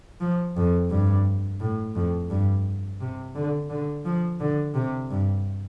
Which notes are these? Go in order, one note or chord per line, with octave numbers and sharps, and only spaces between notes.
F3
F2
G2
A2
F2
G2
C3
D3
D3
F3
D3
C3
G2